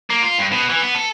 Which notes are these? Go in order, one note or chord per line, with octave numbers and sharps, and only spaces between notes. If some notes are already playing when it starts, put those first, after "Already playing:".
A#3
F4
G2
B2
E3
B3
A4